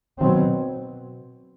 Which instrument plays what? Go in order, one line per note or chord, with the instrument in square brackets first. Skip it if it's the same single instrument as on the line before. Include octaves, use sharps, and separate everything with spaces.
[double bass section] B2 F#3 C4 [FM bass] D#3
[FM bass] B2